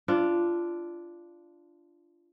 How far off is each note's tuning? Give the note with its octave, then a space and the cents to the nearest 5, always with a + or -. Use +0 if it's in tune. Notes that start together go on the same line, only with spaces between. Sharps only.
D4 +0 F4 -20